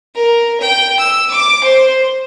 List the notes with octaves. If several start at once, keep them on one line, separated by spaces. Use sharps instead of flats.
A#4
G5
E6
D6
C5